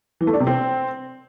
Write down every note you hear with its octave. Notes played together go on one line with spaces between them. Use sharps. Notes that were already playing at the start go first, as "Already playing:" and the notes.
E3
A3
D4
C3
C4